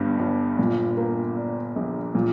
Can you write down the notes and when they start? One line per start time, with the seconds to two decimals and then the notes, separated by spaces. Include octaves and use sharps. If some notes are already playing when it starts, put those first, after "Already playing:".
Already playing: G1 G2 G3
0.19 G1
0.59 A#2
0.97 A#3
1.37 D4
1.76 A#1
2.15 A#2